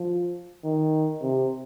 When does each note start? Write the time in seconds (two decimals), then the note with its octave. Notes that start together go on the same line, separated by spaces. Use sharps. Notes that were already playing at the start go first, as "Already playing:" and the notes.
Already playing: F3
0.64 D#3
1.22 C3